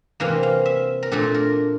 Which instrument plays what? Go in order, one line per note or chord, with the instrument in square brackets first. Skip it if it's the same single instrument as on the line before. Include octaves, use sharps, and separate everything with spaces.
[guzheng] C3 E3 A#3 F5
F5
E5
A#4
A#2 A3 D4 A4
A#4